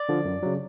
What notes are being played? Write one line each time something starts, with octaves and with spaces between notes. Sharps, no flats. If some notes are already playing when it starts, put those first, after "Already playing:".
Already playing: D5
D3 F3
F#2
C#3 F#3